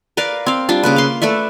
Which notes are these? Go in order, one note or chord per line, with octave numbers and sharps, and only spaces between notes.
A#4 B4 D5 F5
C4 F5
G3 D4 F4
C#3 A#3 B4
F5 C6
A3 B4 D5 E5